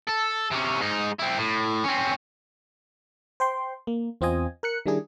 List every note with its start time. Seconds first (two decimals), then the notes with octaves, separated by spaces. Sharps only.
0.07 A4
0.51 C3 C#4
0.80 G#2 D#4
1.19 C4 E4
1.37 A2
1.84 C4 C#4
3.40 C5 G5 C6
3.87 A#3
4.21 E2 C4 F4 D#5 G#5
4.63 A#4 F#6 C#7
4.86 D#3 G3 D4 E4 G#4